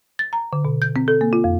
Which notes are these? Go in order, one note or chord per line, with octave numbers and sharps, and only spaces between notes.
A6
A#5
D3
B2
G6
C4
A4
A#3
F4
F2